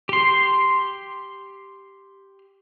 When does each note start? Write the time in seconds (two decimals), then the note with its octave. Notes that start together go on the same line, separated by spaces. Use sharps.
0.09 G4 C6